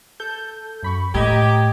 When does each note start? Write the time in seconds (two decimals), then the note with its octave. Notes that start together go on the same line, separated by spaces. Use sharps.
0.20 A4 G6
0.83 F#2 B5 C#6
1.15 A2 G4 D#5 A#5 G#6